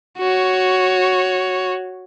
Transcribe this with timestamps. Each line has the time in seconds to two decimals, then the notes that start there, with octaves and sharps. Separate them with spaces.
0.19 F#4 C#5